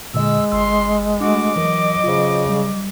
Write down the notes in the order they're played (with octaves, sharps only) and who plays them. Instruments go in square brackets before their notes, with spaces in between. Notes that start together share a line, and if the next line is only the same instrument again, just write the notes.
[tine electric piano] A#2 D3 D#5 [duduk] G#3 [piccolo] E6
[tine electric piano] G1 E6 [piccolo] C6
[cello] A3 F#4 [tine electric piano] D4 [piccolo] D6
[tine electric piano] E3 A#4 [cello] F#3 D#5
[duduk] C#3 [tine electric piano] F4 C5
[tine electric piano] G3